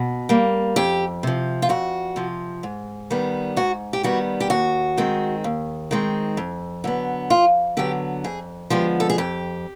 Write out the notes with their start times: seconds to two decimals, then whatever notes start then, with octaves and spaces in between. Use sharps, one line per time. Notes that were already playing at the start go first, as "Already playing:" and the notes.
Already playing: B2
0.29 G3 A#3
0.76 F2 G4
1.23 C3 F3
1.62 F4
1.69 F2 F#4
2.16 C3 F3
2.63 G#2
3.10 D#3 G3 B3
3.56 G#2 F#4
3.93 G4
4.03 D#3 G3 B3 F#4
4.40 G4
4.50 D#2 F#4
4.97 D#3 G#3 C4
5.44 D#2
5.91 D#3 G#3 C4
6.37 F2
6.84 D3 F#3 B3
7.30 F2 F4
7.77 D3 F#3 B3 G4
8.24 F2 G#4
8.70 D3 F3 G#3 B3 G4
9.00 A4
9.10 G#4
9.18 F2 G4